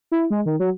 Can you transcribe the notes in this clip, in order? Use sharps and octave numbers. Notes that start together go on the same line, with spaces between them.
E4
G#3
D#3
F#3